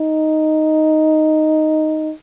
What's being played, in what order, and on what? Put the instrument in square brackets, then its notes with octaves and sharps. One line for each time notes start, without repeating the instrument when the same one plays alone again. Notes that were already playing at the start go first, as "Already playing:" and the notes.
Already playing: [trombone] D#4